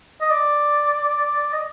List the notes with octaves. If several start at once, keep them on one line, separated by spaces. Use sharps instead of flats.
D#5
D5
D#5